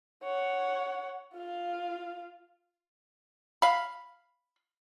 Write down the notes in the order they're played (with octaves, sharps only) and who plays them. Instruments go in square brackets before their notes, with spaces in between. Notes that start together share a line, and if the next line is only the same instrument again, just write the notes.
[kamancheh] C#5 F#5
F4 F5
[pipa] F5 B5